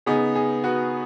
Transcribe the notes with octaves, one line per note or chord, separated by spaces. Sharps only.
C#3 B3 D#4 G#4
G#4
F#4 B4